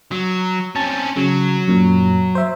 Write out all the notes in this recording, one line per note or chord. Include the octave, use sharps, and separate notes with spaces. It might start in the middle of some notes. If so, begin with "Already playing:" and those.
F#3
C4 C#4 A5 A6
C#3 F#3
F#2 A#2
C5 E5